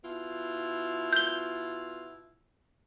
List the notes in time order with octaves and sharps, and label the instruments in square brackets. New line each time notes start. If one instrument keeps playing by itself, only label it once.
[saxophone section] B2 E4 F4
[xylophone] G6 G7